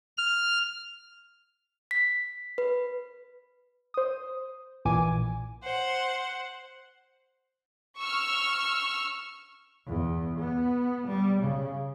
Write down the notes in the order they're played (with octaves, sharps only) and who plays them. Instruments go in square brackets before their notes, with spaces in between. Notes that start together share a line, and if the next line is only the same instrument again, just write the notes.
[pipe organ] F6
[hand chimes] B6
B4
[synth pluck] C5 D#6
A#1 A#2 E3 G#5 D6
[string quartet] C5 F#5
[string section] C#6 E6 F6
[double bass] E2
B3
G3
C#3